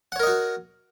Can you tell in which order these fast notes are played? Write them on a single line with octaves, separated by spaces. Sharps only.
F#5 C#5 A#4 D#5 F#4